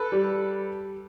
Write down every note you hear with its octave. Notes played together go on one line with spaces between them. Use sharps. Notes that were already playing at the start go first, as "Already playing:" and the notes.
Already playing: A4 B4
G3